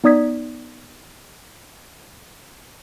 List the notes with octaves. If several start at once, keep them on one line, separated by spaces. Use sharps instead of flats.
B3 D#4 D5 D#6 G#6 B6